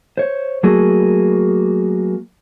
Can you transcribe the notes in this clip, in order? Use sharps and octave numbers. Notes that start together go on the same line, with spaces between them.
C5 C#5
F#3 A3 A#3 F#4 G#4